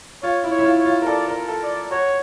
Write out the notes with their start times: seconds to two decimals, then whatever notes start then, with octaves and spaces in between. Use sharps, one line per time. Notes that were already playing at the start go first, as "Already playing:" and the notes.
0.22 F4 C#5
0.44 E4
0.51 C#5
0.59 E4
0.65 F4
0.79 C#5
0.85 F4
1.02 A#4
1.07 A4 D5
1.29 A#4
1.49 A4
1.63 D5
1.91 F#4 C#5